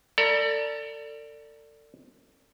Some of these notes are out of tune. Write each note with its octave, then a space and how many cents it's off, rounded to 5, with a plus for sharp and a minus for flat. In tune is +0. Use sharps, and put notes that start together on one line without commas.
A4 +35 D5 +0 A#5 +45